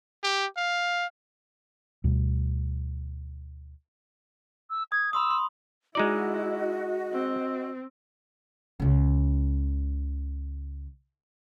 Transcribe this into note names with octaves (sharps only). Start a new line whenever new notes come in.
G4
F5
D2 B2 G3
E6
D#6 G#6
B5 C6 D#6 E6
C6
G#3 D#4 E4 F#4 D5 D#5
C4
C#2 C#3